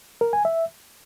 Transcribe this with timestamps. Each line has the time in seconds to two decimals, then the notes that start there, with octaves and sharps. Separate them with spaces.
0.21 A#4
0.33 G#5
0.45 E5